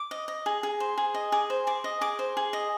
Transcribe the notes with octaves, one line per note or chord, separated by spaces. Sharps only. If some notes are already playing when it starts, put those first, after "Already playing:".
Already playing: D6
D#5
D#5
G#4
G#4
C5
G#4
D#5
G#4 D6
C5
G#4 D6
D#5
G#4 D6
C5
G#4
D#5